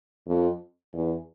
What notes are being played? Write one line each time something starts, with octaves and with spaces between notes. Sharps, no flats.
F2
E2